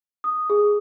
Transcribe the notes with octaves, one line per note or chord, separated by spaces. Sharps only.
D#6
G#4